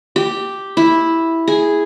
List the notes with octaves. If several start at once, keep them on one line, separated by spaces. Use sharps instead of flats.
G4
E4
G#4